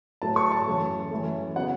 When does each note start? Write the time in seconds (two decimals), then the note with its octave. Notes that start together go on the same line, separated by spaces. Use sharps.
0.22 A2 F#3 A3 A5
0.36 C#6
0.52 A5
0.67 F#2 E3 A3
1.11 F#2 E3 A3
1.56 C#3 F#3 B3 F#5